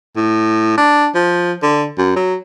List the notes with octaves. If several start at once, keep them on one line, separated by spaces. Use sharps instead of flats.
A2
D4
F3
D3
F#2
F#3